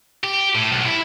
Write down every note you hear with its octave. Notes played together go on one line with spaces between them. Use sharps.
G4
A2
B1
E4